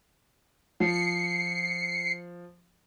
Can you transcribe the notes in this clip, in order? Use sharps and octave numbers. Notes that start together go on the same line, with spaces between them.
F3 C7 C#7